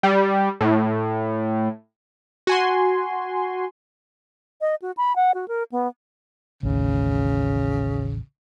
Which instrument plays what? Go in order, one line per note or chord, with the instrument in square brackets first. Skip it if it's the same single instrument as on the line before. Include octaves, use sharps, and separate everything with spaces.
[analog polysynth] G3
A2
F#4 G#5 C6
[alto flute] D#5
F#4
B5
F#5
F#4
A#4
B3
[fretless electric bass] A1 D#2 [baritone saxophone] C#3